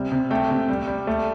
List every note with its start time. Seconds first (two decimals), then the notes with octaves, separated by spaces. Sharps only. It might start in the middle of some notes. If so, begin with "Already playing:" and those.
Already playing: C3 G3
0.12 C3
0.31 A3 G5
0.50 C3
0.69 G3
0.87 G3
1.07 A3